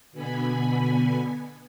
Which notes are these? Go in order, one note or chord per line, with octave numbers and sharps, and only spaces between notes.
B2 D3 B3 G#5 B5